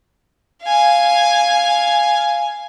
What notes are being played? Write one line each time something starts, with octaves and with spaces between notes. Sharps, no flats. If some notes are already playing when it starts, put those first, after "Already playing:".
F5 G#5